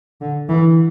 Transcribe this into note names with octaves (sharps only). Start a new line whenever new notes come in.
D3
E3